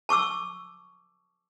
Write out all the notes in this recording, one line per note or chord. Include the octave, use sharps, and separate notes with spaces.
A5 C#6 D6 E6